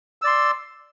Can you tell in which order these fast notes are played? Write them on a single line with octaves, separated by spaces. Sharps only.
E6 D5 C6